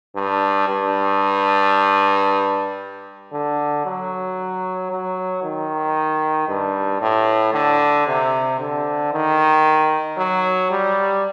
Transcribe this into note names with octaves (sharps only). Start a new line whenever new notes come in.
G2
G2
D3
F#3
F#3
D#3
G2
A2
D3
C3
D3
D#3
F#3
G3